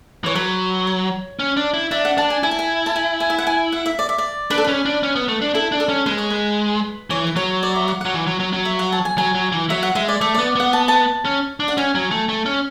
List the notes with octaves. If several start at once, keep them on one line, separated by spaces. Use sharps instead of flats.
E3 C#5
F#3 B4
C#5
C#4
D4
E4
D4 E5
F#5
D4 A5
G#5
E4 G#5
A5
G#5
A5
G#5
G#5
E5
F#5
G#5
F#5
E5
D5
E5
D5
D4 B4
A4
C#4 B4
D4
C#4
B3
A3
D4
E4 A4
D4
A4
C#4
G#3 B4
C#5
B4
E3 C#5
B4
F#3 C#5
D5
E5
F#5
F#3 F#5
E3
F#3
F#3
F#3
E5
F#5
A5
G#5
F#3 G#5
F#3
E3
F#3 E5
F#5
G#3 E5
D5
A3 E5
B3 D5
B3 F#5
A5
A5
C#4
D4
F#5
C#4 G#5
F#3
A3
A3
C#4